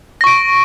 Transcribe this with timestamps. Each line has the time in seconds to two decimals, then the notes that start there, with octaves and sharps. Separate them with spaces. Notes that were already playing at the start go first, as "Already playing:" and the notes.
0.21 A#6
0.24 C#6
0.27 D7